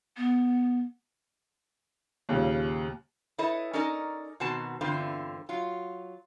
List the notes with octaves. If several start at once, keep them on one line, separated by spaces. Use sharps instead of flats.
B3
D#2 A#2 C#3 G3
E4 A4 B4 C#5 D#5
C#4 D#4 A4 A#4 D5 D#5
B2 D#3 C4 F#4 A5
E2 G2 D3 C4 F4
F#3 F4